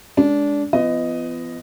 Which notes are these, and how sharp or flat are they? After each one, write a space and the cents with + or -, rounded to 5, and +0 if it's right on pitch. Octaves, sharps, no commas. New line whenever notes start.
G#3 +0 D4 -20
F3 -30 B3 +30 D#5 +0